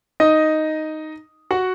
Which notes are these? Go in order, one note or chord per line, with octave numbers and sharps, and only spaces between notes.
D#4 D#5
F#4 F#5